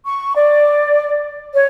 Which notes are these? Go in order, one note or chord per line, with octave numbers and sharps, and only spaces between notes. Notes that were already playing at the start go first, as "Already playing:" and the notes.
C#6
D5
C#5